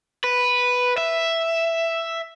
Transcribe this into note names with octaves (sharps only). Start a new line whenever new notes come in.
B4
E5